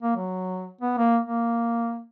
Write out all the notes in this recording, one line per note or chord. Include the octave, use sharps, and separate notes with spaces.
A#3
F#3
B3
A#3
A#3